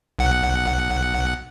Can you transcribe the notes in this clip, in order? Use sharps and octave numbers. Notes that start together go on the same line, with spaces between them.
B1 F#5